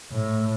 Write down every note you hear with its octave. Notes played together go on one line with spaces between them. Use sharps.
A2